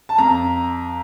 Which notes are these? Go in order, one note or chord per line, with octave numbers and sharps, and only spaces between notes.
A5
F2 A#5